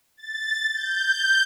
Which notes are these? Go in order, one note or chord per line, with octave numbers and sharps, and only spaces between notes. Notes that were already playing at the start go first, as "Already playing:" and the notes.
A6
G6